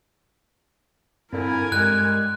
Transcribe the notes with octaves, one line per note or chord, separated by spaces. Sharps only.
G2 A#2 D3 C4 E4 A#4 G#5
G2 G3 G#3 F#6